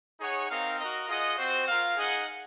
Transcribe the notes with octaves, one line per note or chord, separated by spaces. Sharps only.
D#4 G#4 C#5 F#5
C4 D#4 A#4 F5
F#4 A#4 D#5
F4 G#4 D#5 F#5
C4 F#4 C5
F4 A#4 F5
D#4 G#4 D#5 F#5